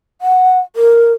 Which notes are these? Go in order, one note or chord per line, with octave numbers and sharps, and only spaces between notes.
F#5
A#4